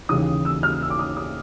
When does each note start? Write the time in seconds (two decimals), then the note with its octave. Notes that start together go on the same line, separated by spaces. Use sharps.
0.09 D#2 C#3 E3 D#6
0.45 E6
0.63 F6
0.81 E6
0.90 D6
0.99 D#6
1.17 D#6